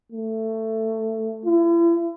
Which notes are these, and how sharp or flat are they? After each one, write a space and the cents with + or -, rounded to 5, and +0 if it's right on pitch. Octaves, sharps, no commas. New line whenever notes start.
A3 +15
E4 +40